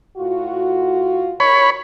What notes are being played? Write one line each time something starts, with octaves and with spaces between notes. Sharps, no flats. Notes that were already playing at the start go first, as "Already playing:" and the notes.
A2 F4 F#4
D#3 C#5 B5